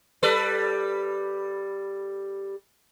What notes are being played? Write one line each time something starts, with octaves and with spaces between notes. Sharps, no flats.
G3 A4 B4